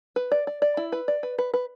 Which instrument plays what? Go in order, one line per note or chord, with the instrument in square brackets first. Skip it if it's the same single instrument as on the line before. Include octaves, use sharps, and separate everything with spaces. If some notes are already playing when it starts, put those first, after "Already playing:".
[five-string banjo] B4
D5
D5
D5
E4
B4
D5
B4
B4
B4